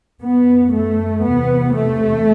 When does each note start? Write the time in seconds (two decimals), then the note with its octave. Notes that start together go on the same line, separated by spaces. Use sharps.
0.23 F#2 B3
0.74 A3
1.24 E2 C3 B3
1.75 A3